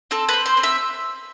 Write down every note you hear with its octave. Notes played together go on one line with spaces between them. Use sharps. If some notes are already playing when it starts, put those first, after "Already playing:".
C4 A4
C4 B4
C5
C4
E5